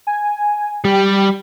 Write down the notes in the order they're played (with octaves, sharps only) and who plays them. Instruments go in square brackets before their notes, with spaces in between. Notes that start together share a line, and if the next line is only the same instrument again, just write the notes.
[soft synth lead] G#5
[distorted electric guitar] G3 [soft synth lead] G4